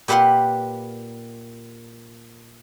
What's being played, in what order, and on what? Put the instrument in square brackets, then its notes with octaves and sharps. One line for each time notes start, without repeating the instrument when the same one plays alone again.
[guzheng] A#2 G4 B4 F5 F#5 C6